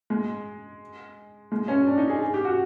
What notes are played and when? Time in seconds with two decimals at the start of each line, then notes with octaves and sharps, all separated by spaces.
0.10 G#3
1.52 G#3
1.68 C#4
1.87 D4
1.98 D#4
2.09 G#4
2.21 G#4
2.34 G4
2.45 F#4